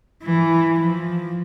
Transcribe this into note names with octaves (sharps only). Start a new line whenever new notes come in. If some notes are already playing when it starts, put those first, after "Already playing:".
E3
F3